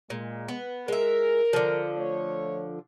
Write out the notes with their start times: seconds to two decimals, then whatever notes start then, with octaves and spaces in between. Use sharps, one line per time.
0.10 A#2 G#3
0.48 B3
0.88 G#3 A#4 E5
1.53 D3 F3
1.97 A3 C#5